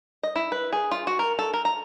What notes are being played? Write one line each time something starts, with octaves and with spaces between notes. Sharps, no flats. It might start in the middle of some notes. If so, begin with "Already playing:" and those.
D#5
E4
B4
G#4
F4
F#4
A#4
A4
A#4
A#5